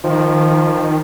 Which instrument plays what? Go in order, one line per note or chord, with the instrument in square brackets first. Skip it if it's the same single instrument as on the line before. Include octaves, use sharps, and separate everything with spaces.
[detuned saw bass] D#3 [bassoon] F3